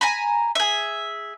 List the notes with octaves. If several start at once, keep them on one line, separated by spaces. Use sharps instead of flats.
G#5 A#5 B5
G#4 E5